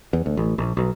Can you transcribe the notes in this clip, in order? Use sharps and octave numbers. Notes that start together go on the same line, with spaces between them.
E2
D2
A1
A#1
B1